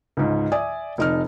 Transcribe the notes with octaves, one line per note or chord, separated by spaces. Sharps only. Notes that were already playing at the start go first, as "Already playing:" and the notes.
C#2 G#2
D5 E5 G#5 D#6
F1 D#4 F6